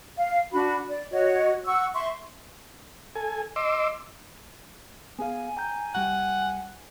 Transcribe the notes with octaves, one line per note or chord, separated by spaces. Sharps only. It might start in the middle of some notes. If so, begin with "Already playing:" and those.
F5
D4 F#4 B5
D5
F#4 C#5 D#5
F#5 C#6 E6
E5 C6 C#6
A4 G#5
D#5 C6 D6 E6
B3 G#4 F5 G#5
G5 A#5 G6
C2 G3 F#5 G5